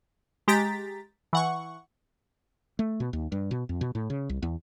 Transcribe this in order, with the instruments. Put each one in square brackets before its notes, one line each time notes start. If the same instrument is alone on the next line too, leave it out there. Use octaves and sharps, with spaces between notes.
[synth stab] G#3 G4 A#5 A6 B6
E3 F#5 C#6
[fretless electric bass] A3
B2
D#2
G2
B2
F2
B2
A2
C#3
C2
E2